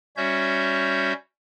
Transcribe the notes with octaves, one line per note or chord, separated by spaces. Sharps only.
G3 C#4 F#4 C#5 E5 G6